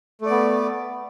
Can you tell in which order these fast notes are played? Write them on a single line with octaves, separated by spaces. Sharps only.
A3 D5 B3